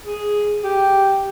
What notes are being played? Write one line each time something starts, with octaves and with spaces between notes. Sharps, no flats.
G#4
G4